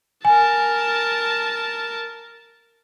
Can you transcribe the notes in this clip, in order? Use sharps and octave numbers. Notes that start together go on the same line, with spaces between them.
A#4 G#5 A5